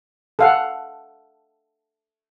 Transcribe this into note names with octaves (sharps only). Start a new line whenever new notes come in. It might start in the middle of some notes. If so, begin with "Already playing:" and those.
A4 F5 F#5